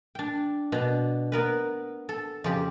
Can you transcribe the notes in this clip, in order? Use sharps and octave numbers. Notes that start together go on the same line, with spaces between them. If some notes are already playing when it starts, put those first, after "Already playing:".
D4 G5
B2 D4
B3 A#4 B4
A4
F2 C#3 G4